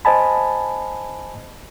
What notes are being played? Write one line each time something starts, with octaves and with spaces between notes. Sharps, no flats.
C5 D#5 G#5 A5 B5